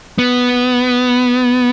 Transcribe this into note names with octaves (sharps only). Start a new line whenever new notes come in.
B3